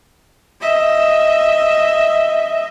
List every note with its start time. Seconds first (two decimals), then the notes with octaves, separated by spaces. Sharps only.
0.61 D#5 E5